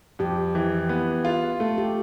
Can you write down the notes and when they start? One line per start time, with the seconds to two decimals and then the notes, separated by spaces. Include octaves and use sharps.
0.19 F2 G4
0.55 E3
0.89 B3
1.25 F4
1.60 A3 A4
1.78 G4